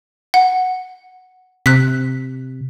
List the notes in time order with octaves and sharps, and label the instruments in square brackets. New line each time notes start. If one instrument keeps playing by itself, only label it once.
[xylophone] F#5
[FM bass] C3 [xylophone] F#6 B6